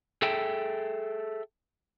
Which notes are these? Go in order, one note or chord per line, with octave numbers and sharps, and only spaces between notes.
G#4 A4 E5 G5